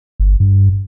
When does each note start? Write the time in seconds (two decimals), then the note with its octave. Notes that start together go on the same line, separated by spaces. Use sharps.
0.20 G1
0.40 G2